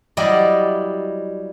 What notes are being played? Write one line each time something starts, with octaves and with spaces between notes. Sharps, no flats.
F#3 G3 E4 D5 D#5